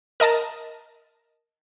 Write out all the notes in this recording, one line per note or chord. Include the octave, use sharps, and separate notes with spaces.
A#4 D#5 A5 A#5